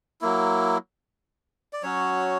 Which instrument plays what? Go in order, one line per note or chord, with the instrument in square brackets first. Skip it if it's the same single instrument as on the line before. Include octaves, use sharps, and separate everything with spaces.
[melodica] F#3 A#3 E4
D5
F#3 C#4 F#4 C#5